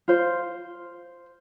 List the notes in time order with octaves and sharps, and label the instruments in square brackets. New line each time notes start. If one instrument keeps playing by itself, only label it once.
[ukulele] F4 C5